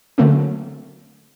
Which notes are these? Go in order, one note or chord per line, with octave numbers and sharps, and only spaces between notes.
D3 F#3 A3 A#3 C4 C#4